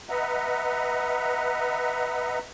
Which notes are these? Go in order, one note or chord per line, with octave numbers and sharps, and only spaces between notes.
B4 D#5 E5 F#5 A#5